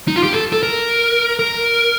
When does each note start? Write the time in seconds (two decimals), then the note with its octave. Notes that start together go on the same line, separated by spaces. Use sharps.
0.08 D#4
0.16 F4
0.23 G4
0.33 A4
0.52 A4
0.63 A#4
1.39 A#4